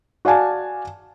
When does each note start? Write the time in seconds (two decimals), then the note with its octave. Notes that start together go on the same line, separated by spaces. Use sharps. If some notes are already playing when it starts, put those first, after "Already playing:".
0.25 F#4 D5 F5 G#5 A5